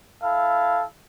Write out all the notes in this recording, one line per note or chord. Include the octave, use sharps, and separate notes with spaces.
E4 A4 F5